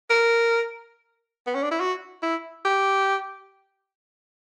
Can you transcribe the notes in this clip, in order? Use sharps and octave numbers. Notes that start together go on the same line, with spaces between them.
A#4
B3
C#4
D4
E4
F#4
E4
G4